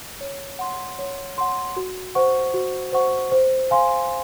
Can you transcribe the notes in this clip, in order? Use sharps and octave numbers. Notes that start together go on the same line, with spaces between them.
C#5
F#5 C6
C#5
F#5 C6
F#4
C5 F#5 C#6
F#4
C5 F#5 C#6
C5
F5 G#5 C6